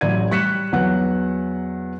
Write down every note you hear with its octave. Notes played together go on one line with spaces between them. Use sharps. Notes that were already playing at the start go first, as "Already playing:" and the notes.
A1 F#3 D5 G#6 D#7
G3 C#6 F#6 B6 C#7 E7
E2 F#3 B4 F#5 F#6